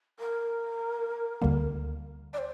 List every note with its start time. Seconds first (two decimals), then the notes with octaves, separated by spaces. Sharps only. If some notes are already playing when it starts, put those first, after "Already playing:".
0.20 A#4
1.42 D2 D3 G3 A#3
2.33 D5
2.38 C5